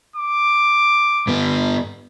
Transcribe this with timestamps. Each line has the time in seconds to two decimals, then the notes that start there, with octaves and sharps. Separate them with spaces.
0.16 D6
1.27 G2 B3